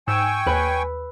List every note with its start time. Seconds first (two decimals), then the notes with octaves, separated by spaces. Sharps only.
0.08 G#2 G5 G#5 C#6 E6
0.46 D#2 B4